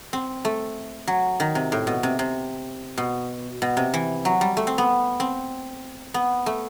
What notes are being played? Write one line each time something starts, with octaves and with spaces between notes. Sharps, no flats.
C4
A3
F#3
D#3
C3
A2
B2
C3
C3
B2
B2
C3
E3
F#3
G3
A3
C4
B3
C4
B3
A3